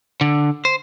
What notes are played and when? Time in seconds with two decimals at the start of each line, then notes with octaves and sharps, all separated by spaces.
0.21 D3
0.65 C5